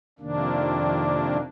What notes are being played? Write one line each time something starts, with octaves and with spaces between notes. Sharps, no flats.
F2 C3 D#3 A#3 D4